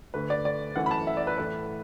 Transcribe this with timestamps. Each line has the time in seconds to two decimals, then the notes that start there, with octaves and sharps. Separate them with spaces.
0.14 D2 D3 A3 B4
0.30 D5
0.45 D5
0.76 F#2 E3 A3 F#5
0.86 B5
0.91 A5
1.07 E5
1.17 D5
1.27 B4
1.38 A2 E3 A3 B4